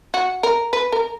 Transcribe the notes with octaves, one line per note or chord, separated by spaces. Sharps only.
F#4
A#4
B4
A#4